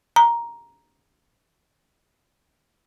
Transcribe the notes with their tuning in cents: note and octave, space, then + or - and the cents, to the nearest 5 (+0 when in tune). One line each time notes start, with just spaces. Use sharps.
A#5 +10